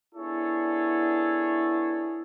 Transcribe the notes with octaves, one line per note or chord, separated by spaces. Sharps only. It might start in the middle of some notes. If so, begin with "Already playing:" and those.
B3 D4 E4 G#4 A4 C#5